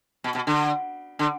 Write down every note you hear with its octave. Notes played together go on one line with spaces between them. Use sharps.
B2
B2
D3
D3